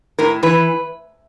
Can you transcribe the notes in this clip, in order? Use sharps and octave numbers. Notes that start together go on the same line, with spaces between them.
A2 A#4
E3 B4